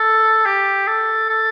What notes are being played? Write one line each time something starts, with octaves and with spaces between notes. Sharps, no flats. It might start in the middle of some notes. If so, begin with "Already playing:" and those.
Already playing: A4
G4
A4
A4